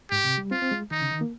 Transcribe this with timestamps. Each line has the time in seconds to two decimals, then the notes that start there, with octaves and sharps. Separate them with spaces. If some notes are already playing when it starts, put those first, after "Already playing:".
0.11 G#2 G4
0.24 C3
0.38 G3
0.51 C4 F4
0.62 C4
0.72 G#3
0.91 D#3 D#4
1.01 C#3
1.12 D#3
1.21 A#3